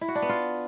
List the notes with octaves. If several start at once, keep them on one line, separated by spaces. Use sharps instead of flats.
E4
F#4
D4
B3
F4